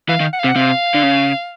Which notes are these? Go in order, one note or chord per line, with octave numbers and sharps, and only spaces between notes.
E3 F5
D#3
F#5
F5
C3
F#5
C3 F5
D3
C#3